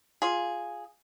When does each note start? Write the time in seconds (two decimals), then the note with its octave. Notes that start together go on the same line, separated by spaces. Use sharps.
0.22 F4 G#4